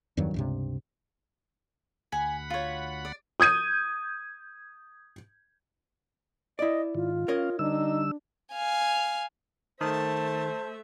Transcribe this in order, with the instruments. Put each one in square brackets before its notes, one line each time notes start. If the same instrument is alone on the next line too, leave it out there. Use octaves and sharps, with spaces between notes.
[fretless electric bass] E2 G2 D#3 F#3
C#2 G2 C3
[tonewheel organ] D2 F#5 B5 [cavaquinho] G#5
[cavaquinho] F4 C#5
D5
[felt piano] D#6 G6 G#6 D#7
[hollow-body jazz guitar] E4 D5 [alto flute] D#5
[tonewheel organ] G#2 D#3 [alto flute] F4
[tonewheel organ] C#4 F5 [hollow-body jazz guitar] A#4 C#5 D#5
[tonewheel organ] D3 G3 E6 [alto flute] D4 [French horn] D#4
[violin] F5 G#5
[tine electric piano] D#3 [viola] A3 E5 [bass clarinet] C5 [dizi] A5